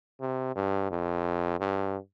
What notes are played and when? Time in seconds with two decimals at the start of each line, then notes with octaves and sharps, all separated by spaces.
0.21 C3
0.55 G2
0.90 F2
1.60 G2